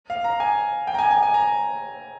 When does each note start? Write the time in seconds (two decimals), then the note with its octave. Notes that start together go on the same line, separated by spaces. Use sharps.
0.10 F5
0.24 A#5
0.40 G#5
0.87 G5
0.94 A#5
0.99 G#5
1.11 G#5
1.23 G#5
1.34 A#5